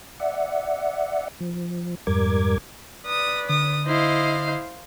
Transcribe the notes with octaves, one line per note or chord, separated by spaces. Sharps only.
D5 E5 F#5
F3
F2 G#2 G3 A#4 D6 G#6
B4 D5 D#6
D3 D#6
E4 C5 D#5 F5